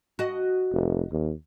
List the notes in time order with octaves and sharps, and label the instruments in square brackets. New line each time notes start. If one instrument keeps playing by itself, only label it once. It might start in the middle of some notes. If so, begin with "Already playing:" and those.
[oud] F#4 D#5
[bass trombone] F1
D#2